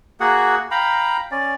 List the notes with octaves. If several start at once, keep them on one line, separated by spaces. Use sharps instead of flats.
A#3 F#4 G#4 F#5
F5 G5 A#5 B5
C#4 D5